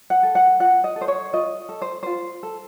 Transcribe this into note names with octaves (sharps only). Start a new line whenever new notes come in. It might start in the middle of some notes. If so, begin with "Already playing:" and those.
F#5
A4
F#5
F4 F#5
D#5
A4
C5
C#5
F4 D#5
A4
C5
F4 C5
A4